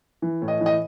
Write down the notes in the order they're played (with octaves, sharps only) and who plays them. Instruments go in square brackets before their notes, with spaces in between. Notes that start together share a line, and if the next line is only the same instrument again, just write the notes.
[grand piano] E3
A2
D#5
E3
D#5